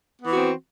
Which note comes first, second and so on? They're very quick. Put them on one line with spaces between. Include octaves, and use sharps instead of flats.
B3 E3 F#4 C4